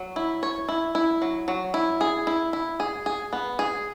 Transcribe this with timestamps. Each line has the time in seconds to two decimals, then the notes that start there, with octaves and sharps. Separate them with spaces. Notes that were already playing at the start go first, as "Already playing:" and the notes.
Already playing: F#3
0.16 E4
0.43 C#5
0.69 E4
0.95 E4
1.22 F#3
1.48 F#3
1.74 E4
2.01 G#4
2.27 E4
2.53 E4
2.80 G#4
3.06 G#4
3.33 B3
3.59 G#4